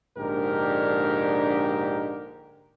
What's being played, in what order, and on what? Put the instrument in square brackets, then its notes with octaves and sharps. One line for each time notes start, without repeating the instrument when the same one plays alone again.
[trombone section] A#1 G#2 D3 D4 G4 A#4